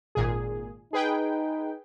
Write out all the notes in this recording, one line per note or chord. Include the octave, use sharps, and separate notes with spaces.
G#1 A#2 G#4
D#4 G#4 B4 G5